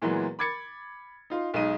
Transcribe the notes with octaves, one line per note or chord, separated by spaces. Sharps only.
A#2 E3 F#3 G#3 B3
B5 D6 G#6 A6 C#7
D#4 F4 C6
B1 G#3 D#4 D#7